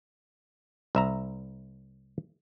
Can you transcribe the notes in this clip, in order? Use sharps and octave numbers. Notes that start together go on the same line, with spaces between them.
C2 E5 A#5